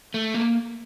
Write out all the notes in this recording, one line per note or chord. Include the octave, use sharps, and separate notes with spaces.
A3
A#3